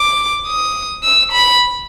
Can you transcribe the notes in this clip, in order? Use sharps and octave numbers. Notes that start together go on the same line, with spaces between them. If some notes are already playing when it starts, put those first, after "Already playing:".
Already playing: D6
D#6
E6
B5